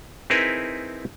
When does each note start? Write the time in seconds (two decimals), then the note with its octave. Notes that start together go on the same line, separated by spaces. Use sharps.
0.30 C4 D#4 E4 G#4 A#4 B4